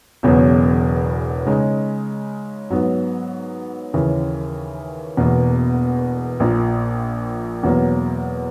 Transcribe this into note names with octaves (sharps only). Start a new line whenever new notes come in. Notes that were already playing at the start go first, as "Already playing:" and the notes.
E1 E2 C#3 F#3 B3
C#3 G#3 D#4
G#2 F#3 B3
D#2 C#3 E3
E1 E2 B2 A#3
A#1 A#2 A#3
E2 B2 F#3 A#3